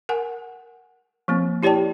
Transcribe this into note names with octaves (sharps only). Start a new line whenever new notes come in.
A#4 F#5 G#5
F3 A#3 C4
E4 G4 C#5 D5 G5 A5